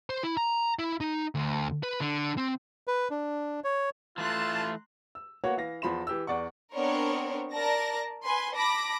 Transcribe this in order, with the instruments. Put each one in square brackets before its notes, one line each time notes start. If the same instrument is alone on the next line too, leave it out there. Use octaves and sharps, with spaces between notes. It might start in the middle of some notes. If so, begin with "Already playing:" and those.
[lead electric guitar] C5
E4
A#5
E4
D#4
D2
B4
D3
C4
[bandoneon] B4
D4
C#5
[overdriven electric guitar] E3 A3 [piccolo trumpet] F4 [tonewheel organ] A5 [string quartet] A#5 C6 F#6
[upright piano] E6
A#3 B3 F#4 C#5 F#5
E3 F5 A#6
E2 F3 B5 C6 E7
E3 G4 E6
E2 D5 F#5 C#6
[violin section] B3 C4 D4 A#4 C5 C#5
A#4 D5 A5 A#6
B4 G#5 C6
A5 B5 D6 A#6